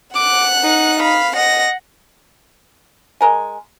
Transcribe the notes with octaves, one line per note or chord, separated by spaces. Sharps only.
F#5 D6 F#6
D#4
F5 B5
D#5 F#5 A#6
G#3 A#4 G#5